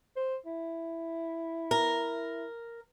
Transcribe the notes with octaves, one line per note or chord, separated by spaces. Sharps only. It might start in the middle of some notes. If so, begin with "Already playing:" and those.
C5
E4
A#4